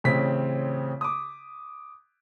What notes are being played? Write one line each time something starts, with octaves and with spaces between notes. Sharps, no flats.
A1 C#3 C4 B6
D6 D#6